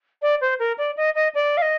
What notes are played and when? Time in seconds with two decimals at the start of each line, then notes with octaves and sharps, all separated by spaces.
0.22 D5
0.41 C5
0.60 A#4
0.78 D5
0.97 D#5
1.15 D#5
1.35 D5
1.57 F5
1.62 D#5